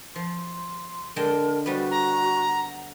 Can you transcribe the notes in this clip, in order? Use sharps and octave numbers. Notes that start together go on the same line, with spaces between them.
F3 C6
D3 G#3 A#4 G5 A5
G3 B3 F#4 C5
F#5 A#5